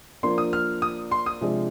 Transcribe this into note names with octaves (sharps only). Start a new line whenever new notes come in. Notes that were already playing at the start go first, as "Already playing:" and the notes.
F3 A#3 D4 C6
D#6
F6
D#6
C6
D#6
C3 F3 G#3 D4